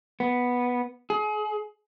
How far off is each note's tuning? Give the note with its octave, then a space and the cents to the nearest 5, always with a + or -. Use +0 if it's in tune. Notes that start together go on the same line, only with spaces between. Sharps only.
B3 -5
G#4 +35